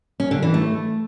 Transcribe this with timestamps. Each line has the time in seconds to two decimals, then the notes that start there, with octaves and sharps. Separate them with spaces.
0.20 C#4
0.31 D3
0.42 E3
0.54 A3